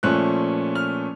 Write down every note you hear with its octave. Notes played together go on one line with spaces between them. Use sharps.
A#2 F3 A3 C#4 F#6
F6